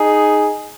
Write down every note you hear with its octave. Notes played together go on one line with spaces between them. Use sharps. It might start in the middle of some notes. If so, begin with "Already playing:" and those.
Already playing: D#4 G#4